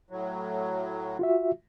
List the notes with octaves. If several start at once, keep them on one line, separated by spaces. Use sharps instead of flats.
A2 F#3
F4 F#4 E5